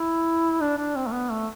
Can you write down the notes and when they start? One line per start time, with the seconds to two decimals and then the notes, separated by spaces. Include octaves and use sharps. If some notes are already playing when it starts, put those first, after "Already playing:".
Already playing: E4
0.61 D4
0.78 D4
0.96 C4
1.07 A3
1.12 B3
1.30 A3